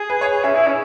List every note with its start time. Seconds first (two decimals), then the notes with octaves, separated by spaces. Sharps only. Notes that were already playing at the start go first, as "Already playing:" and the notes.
Already playing: G#4
0.10 B4
0.21 C#5
0.44 C#4 E5
0.55 E4 G#4
0.67 C#4